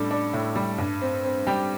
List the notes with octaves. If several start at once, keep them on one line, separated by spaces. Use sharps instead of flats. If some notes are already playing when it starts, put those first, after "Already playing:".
Already playing: A2 G3 D4 A4
D4
A2
G3
G2
C4
C4
G3 G4